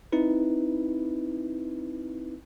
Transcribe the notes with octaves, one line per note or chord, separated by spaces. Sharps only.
C4 D#4 E4 B4